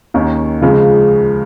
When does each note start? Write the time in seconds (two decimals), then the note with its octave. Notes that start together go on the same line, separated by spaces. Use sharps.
0.14 D#2 D#3 C#4
0.62 C#2 C#3 F3 G#3